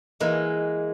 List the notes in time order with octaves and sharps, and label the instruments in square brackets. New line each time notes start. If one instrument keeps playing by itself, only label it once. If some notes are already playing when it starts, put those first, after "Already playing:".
[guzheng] E3 G#3 A#3